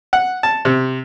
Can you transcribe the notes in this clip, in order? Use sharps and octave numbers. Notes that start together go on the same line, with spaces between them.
F#5
A5
C3